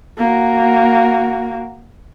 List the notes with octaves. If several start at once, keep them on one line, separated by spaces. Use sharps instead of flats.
A#3 F#4